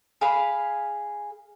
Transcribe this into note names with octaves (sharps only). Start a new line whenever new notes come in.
G#4 F5 B5